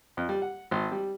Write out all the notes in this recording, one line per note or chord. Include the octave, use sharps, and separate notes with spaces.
F2
G3
F#5
G#1
G3